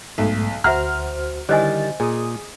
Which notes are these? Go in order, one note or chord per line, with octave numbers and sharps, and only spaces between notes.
B1 G#2 A3
D2 F#4 C5 E5 F#5 A#5 F6
D3 D#3 G3 E4 C5 D#5 G#5 A6
A#2 G#4 D#6